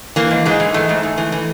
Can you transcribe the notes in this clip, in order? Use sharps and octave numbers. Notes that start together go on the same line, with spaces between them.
E3 A#3
G#2
G#2 G#3
E3
G#2 A3
G#2
G#2
E3
E3